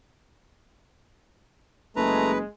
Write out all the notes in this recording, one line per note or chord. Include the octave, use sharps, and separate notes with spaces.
F#1 G#3 A3 B4 A#5